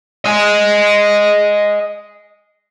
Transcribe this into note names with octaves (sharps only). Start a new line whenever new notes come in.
D#5 G#5